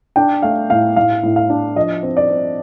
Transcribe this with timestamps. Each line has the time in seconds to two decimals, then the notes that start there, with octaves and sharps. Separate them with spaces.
0.16 D4 G5
0.42 A3 F5
0.70 A2 F5
0.96 A2 F5
1.23 A2
1.36 F5
1.50 D4
1.76 F3 D#5
2.03 C4
2.17 D5
2.30 C4